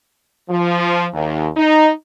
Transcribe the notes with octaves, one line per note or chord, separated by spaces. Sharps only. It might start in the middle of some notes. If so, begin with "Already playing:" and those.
F3
D#2
D#4